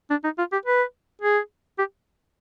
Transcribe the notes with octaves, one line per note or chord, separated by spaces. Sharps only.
D4
D#4
F4
G4
B4
G#4
G4